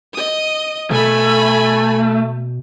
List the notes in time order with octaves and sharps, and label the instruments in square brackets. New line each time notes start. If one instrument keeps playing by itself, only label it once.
[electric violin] D#5 D#6
[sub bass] B2 [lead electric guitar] A3 [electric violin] G#5 B5